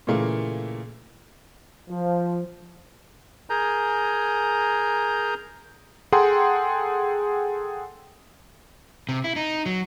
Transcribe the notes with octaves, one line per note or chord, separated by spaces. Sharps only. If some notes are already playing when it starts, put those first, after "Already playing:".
A#2 C#3 E3 A3 A#3
F3
G#4 A#4 G#5 A#5 G6
G#4 A4 F#5 G5 A#5 C6
C3
E4
D#4
F#3